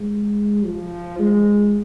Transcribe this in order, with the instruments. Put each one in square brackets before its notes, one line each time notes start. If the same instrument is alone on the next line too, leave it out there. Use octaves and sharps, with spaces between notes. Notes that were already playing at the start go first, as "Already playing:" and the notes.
Already playing: [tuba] G#3
F3
G#3